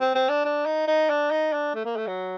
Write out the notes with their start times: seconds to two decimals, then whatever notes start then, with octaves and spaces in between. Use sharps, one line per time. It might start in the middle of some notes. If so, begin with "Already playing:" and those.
0.01 C4
0.15 C4
0.29 D4
0.45 D4
0.66 D#4
0.87 D#4
1.10 D4
1.31 D#4
1.53 D4
1.75 A3
1.85 A#3
1.97 A3
2.07 F#3